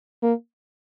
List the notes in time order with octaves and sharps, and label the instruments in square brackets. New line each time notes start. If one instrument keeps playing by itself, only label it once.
[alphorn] A#3